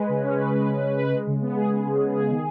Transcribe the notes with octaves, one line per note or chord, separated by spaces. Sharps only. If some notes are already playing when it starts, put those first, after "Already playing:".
Already playing: G#3 B4
C#3
C#4
B4
G#3
C#3
C#4
B4
G#3
C#3
B3
G#4
G#3
C#3
B3
G#4
D#3